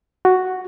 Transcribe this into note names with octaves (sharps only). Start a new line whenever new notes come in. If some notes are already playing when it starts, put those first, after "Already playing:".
F#4